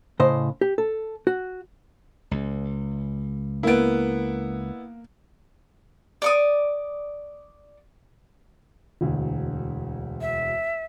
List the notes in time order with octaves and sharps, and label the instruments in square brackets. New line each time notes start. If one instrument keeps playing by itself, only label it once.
[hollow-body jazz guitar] A2 C#3 C5 D#5
G4
A4
F#4
[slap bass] C#2
[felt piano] A#3 D7 [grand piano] B3 E4
[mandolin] D5 C#6 D#6
[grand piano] E1 D2
[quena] E5